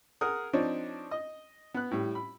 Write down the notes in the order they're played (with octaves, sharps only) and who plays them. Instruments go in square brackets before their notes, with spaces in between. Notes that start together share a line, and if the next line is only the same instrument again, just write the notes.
[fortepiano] G#4 A#4 F#5 D#6
F3 C4 D4 D#4 C#5
D#5
B3 F#6
A2 G3
B5